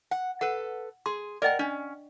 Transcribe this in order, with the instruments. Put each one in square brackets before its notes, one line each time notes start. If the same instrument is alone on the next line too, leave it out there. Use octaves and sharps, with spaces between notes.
[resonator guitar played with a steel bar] F#5
[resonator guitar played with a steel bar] A4 B4 [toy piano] F#5
[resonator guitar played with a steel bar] G#4 [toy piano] C6
[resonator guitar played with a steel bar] A#4 F#5 [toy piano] D5 D#5 G5
[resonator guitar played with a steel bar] C#4 [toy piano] D4